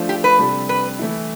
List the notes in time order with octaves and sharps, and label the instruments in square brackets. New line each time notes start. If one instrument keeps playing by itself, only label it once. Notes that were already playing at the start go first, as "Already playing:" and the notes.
Already playing: [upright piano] F3 A3 D4 F4 C5
[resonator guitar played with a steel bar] G4
B4
[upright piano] C3 G3 D4 A4
[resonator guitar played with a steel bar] B4
[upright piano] E3 A3 E4